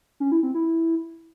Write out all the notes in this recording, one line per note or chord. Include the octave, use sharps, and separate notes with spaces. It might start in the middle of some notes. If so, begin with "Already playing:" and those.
C#4
E4
C4
E4